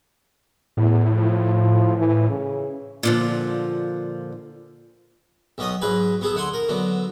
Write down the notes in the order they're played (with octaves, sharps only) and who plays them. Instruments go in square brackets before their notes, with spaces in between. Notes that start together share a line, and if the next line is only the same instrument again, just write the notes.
[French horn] E2 [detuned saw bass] A2
[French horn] F3
E3
C#3
[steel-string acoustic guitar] A#2 D3 F3
[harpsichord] B1 B3 C#4 D#5 D#6
G#2 F#3 B4 G#5
B3 G#4 A4
D3 F#5 G#5 C6
A#4
D3 F#3 B3